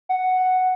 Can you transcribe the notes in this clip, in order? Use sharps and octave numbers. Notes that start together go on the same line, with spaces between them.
F#5